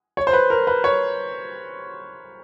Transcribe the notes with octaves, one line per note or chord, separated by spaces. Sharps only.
C#5
C5
B4
A#4
B4
C#5